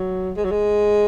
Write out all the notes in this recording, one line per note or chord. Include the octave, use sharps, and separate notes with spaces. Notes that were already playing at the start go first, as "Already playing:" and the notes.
Already playing: F#3
G#3
F#3
G#3